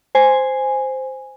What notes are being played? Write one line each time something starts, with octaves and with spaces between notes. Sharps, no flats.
C5 G#5